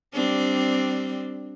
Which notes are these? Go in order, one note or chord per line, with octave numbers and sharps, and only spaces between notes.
G3 C4 D4